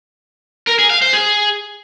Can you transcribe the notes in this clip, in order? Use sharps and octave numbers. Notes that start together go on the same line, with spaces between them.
A#4
G#4
F5
C5
G#4